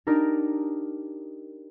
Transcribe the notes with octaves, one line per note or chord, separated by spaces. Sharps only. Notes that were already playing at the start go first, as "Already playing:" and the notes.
D4 D#4 G4 A#4